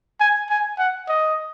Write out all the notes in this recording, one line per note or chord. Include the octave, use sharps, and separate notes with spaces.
G#5
G#5
F#5
D#5